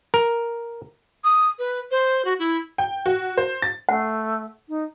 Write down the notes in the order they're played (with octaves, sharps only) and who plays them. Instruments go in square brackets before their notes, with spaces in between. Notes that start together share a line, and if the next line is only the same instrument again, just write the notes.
[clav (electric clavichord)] A#4
[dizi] D#6
B4
C5
F#4
E4
[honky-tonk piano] G5
F#4
C5
A6
[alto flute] A3 [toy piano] F#5
[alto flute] D#4